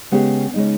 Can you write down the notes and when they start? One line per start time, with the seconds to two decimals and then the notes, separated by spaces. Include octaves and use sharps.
0.12 C#3 G#3 B3 G4
0.54 C#3 G#3 D#4